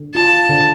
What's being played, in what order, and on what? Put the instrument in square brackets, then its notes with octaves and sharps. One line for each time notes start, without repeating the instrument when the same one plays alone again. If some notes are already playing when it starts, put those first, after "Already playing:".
Already playing: [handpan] D3
[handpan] F4 [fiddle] A5
[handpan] D3